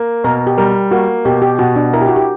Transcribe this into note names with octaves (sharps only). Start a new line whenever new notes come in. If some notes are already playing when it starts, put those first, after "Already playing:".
Already playing: A#3
B2 A#4
G4
G3 A#4
A#3 F#4
B2 G4
G4
B2 F#4
D4
E4 A#4
G4
F#4
G4